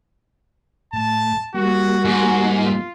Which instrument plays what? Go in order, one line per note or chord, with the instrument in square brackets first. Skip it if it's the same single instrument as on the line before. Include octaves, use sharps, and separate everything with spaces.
[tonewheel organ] A2 [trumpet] A5
[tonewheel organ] G3 A#3 [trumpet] F#4
[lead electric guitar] G#2 [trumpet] F#4
[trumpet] F4